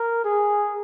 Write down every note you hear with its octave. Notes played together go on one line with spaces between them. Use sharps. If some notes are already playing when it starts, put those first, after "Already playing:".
Already playing: A#4
G#4